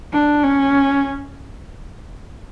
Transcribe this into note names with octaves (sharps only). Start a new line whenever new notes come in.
D4
C#4